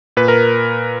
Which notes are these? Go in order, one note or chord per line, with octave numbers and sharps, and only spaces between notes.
A#2 B4
A#4